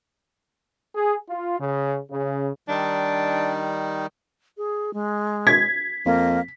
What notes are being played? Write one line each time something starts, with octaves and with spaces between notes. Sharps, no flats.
G#4
F4
C#3
C#3
D#3 G3 D4 D#4
G#4
G#3
G#6 B6
F2 A#3